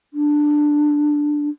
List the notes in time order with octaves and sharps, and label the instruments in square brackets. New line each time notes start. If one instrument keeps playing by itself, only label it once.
[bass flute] D4